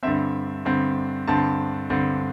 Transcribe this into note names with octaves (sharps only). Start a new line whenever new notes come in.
G2 D3 C4 E5
G2 D3 C4
G2 D3 C4 A5
G2 D3 C4